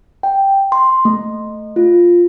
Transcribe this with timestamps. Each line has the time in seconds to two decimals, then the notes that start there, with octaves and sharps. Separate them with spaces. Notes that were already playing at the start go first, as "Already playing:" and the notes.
0.23 G5
0.72 C6
1.05 A3
1.76 F4